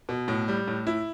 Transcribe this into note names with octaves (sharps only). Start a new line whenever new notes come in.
B2
A2
G3
A2
E4